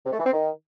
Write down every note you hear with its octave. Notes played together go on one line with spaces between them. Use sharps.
C3
A3
E3
C4
D#3